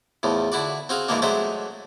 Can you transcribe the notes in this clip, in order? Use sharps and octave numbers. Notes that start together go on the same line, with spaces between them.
E2 A2 F3
D3 E4 F#4 D5
C4 F#4 G#4 F5
G#2 E3 F3 G#3 A#3 D4
F#3 G#3 A3 D4 C5 E5